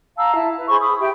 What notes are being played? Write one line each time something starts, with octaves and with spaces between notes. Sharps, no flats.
F5 A5 A#5 E6
E4 A5
B4
G#4 C5 B5 C#6
B5 D#6
G4 E5 G5